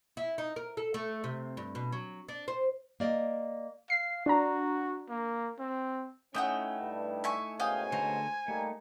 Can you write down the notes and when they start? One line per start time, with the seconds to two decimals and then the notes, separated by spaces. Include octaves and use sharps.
0.17 E4
0.38 D#4
0.56 A#4
0.77 A4
0.94 A3
1.24 C3
1.57 G2
1.75 B2
1.92 F#3
2.28 D4
2.48 C5
3.00 A#3 D5 D#5
3.90 F5 C7
4.26 D4 F#4 A#5
5.09 A#3
5.59 C4
6.35 A3 C#4 D#4 E4 F#5 G5 D#6
6.82 G2
7.24 E5 G#5 C#6
7.60 G#2 B2 C#4 F5 G5 G#5 D#6
7.92 D3 A3 C5 A#5
8.48 G3 A3 A#3 D#4